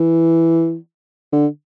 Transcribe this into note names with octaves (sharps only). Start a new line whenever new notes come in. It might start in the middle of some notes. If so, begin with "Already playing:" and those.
Already playing: E3
D3